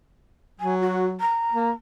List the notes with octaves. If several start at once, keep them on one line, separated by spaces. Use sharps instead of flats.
F#3 G#5
F#4
A#5
A#3